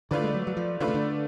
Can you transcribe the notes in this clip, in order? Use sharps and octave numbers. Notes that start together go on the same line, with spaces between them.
D3 A3 F4 B4 D5
G#3
F#3
F#3
F3
D3 A3 F4 B4 D5
C#3
D3